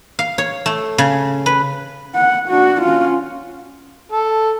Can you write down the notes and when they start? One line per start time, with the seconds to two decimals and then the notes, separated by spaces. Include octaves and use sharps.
0.19 F5
0.38 C#5
0.66 A3
0.98 C#3
1.46 B4
2.15 F#5
2.49 D4 F#4
2.82 C#4 F4
4.12 A4